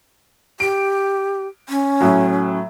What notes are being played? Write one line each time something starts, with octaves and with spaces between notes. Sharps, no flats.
G4 D7
C#4
A2 F#3